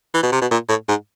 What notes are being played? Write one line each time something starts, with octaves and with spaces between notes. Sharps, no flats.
E3
B2
C3
B2
A#2
A2
G#2